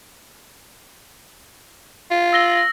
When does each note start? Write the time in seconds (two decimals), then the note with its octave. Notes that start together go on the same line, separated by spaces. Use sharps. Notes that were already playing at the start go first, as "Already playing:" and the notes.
2.11 F4
2.33 E6 A#6 G7